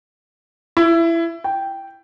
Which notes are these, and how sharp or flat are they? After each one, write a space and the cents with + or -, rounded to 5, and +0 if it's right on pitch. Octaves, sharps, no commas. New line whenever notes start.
E4 +20
G5 -5